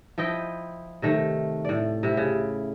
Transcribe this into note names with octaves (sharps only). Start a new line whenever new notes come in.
F3 E4 D#5 G5
C3 D#3 A3
A2 D5
C3 E4
C#3